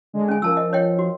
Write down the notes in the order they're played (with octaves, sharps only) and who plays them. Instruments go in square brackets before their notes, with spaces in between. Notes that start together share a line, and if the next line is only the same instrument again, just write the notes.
[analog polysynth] D3 G#3
[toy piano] C#4 G#5
[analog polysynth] F3 [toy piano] A#4 A5 E6
[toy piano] D#5
C#5 D#5 G5
F#4